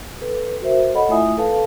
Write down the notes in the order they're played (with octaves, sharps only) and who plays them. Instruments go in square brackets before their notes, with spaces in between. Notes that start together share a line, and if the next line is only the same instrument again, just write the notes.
[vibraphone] A4 B4
F#4 A#4 C5 E5
A4 C#5 D#5 F#5 B5
A3 E4 F4 E5 G#5 D#6
A4 B4 F5 A5